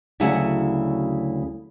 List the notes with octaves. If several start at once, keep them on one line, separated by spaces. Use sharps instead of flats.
D2 C#3 F#3 E4 F#5 G#5